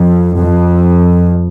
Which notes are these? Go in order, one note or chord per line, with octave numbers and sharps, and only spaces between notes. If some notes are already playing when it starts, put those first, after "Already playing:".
Already playing: F2
F2